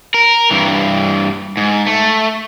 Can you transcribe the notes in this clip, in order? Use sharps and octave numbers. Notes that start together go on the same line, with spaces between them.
A#4
G2 E3
G#2
A3